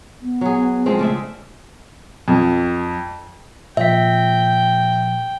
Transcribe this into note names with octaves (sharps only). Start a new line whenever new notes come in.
B3
F#3 G#4
F3 G#3 C4
C#3 A3 D5 E5
F2
A#2 F3 E5 G5 B6